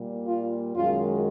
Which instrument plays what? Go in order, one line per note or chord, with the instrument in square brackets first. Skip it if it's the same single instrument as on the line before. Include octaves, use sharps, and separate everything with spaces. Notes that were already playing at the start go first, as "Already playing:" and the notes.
Already playing: [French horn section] A#2 G3
F4
F#2 D#3 G#3 F4